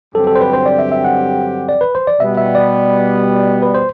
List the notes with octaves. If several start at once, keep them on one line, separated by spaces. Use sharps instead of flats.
G2 D3 F#3 C4 G4 A4
A4
C5
B4
C5
D5
E5
E5
F#5
D5
B4
C5
D5
B2 G3 B3 E5
E5
D5
B4
C5